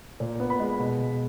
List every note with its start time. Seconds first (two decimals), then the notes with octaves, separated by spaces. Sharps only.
0.20 A#2
0.40 B3
0.50 B5
0.60 G#3
0.79 B2
0.98 B2